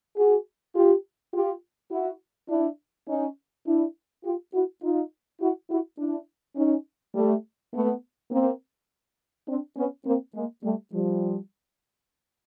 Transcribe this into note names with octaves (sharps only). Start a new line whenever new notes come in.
F#4 G#4
F4 G4
F4 G4
E4 F#4
D4 E4
C#4 D#4
D4 E4
F4 G4
E4 F#4
D#4 F4
E4 F#4
E4 F#4
D4 E4
C#4 D#4
G3 A3
A3 B3
A#3 C4
C4 D4
B3 C#4
A#3 C4
G#3 A#3
G3 A3
F3 G3